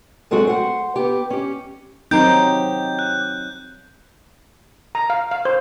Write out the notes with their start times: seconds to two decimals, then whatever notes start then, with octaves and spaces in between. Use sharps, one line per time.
0.31 F#3 G#3 A3 C4 F#4
0.47 C5 F#5
0.96 B3 G4
1.30 C#4 G4
2.11 F#3 C4 D#4 G4 A#4 C6 G6
2.99 F#6
4.95 A#5
5.10 F5
5.31 F5
5.45 C5